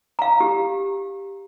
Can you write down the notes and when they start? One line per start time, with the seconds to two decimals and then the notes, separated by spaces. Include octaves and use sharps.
0.19 F5 A#5
0.40 G4